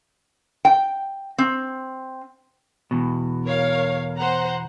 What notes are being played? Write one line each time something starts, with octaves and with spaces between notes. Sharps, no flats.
G5
C4
E2 B2
A#4 C#5 F5
C5 F#5 A#5